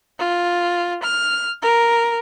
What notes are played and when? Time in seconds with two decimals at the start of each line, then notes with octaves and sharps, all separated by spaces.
0.20 F4
1.03 F6
1.62 A#4